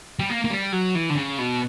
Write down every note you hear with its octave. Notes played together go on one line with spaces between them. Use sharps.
G3
A#3
A#3
G3
F#3
E3
D3
C#3
B2